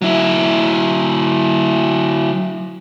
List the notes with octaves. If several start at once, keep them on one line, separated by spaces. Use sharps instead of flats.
F#3 E4